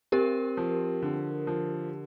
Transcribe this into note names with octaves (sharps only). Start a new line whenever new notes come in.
C4 G4 A#4
F3
D3
F3